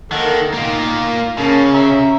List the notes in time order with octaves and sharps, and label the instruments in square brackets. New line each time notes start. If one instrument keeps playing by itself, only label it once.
[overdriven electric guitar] D#3 [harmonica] A#3 A4 F#5
[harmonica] D#3 [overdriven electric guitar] A#3 F4
[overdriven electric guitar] C#3 [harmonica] A#3 A5 [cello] C#4
[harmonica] E5 A#5